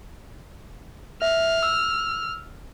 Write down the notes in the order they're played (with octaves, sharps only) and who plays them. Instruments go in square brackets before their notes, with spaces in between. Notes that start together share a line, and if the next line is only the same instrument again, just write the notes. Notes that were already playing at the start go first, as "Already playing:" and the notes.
[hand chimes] E5 [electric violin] F6
[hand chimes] E6